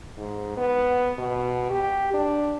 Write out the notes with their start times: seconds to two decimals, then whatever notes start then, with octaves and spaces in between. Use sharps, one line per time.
0.18 G#2
0.57 B3
1.18 B2
1.70 G4
2.14 D4